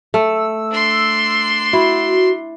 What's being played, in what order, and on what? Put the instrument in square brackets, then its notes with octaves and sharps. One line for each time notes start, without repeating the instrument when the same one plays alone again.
[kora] A3 [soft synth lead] E6
[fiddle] D4 C6
[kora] E4 [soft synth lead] F#4